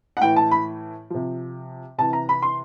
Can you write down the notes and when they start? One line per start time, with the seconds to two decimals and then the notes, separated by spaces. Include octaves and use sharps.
0.17 F#5
0.21 A2 E3 G5
0.36 A5
0.51 B5
1.10 C3 F3
1.98 C3 E3 A5
2.13 A#5
2.29 B5
2.42 C6